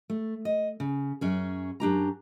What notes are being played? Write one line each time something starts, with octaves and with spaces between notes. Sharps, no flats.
A3
D#5
C#3
F#2 C#4 G#4
F#2 D4 G4 A#5